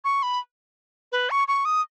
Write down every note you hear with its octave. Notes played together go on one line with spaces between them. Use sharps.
C#6
B5
B4
C#6
C#6
D#6